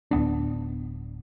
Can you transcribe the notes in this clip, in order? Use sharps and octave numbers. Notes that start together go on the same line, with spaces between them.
D1 B3 D4